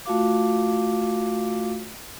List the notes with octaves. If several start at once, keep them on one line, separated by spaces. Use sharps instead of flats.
A3 F4 F#4 F5 D6